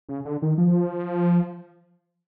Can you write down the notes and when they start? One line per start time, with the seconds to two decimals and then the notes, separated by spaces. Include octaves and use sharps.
0.09 C#3
0.25 D3
0.42 D#3
0.58 F3